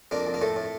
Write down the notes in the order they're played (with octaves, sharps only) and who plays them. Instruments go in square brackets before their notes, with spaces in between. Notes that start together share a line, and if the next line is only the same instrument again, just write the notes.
[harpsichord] F2 A#3 D4
F2
A#3
A2 A3
A2